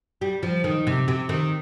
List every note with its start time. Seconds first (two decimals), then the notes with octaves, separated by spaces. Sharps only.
0.21 G3
0.43 F3
0.64 D#3
0.87 C3
1.08 C3
1.29 D#3